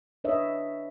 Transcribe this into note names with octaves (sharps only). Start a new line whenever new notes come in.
D4 B4 C#5 D#5 E5